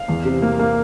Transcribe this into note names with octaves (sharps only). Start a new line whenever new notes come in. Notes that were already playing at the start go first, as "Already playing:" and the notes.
Already playing: F5
E2
C3
A#3
A#3